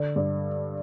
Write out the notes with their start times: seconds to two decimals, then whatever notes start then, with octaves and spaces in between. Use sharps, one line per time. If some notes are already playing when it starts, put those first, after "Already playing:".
Already playing: D3
0.16 G2